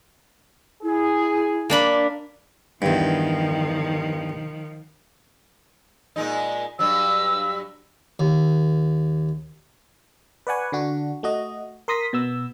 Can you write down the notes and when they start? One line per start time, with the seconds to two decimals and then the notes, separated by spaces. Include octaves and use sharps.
0.83 E4 G#4
1.70 A#3 D4 B5
2.82 E2 G2 D#3 F3
6.16 A#2 G#3 D#4
6.79 G2 F#3 E6
8.19 D#2
10.47 B4 D5 F#5 G#5 C#6
10.72 D3 D4 F#4
11.23 A3 F#4 D#5
11.88 A#4 C6 D#6 A#6 B6
12.13 B2 B3 E6